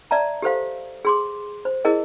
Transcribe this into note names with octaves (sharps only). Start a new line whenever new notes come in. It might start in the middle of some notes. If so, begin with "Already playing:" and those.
D5 E5 A5 A#5
G4 A4 C5 F5
G#4 C6 D6
C5
E4 G#4 A#4 D#5